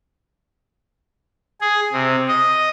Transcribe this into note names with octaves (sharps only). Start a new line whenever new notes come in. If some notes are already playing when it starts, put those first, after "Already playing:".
G#4
C3
D#5